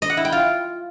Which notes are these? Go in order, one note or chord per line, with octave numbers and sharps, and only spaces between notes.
D#5
F#5
E4
G5
F4